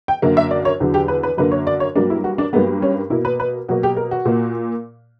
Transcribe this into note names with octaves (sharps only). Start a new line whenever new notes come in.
G5
F#2 D3 A#3
E5
D5
C#5
E2 D3 F#3
G4
B4
B4
F#2 D3 A#3 B4
C#5
D5
C#5
G2 F#3 A#3 D4
E4
F#4
D4
G2 F#3 A#3 B3
C#4
B2 A#3 E4
B4
B4
B2 F#3 A#3 F#4
G4
A#4
F#4
A#2 A#3